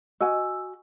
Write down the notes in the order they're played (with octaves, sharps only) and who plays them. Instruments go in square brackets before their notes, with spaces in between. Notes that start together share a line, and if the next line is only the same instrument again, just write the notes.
[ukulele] F#4 G#5 [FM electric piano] D#5 [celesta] E6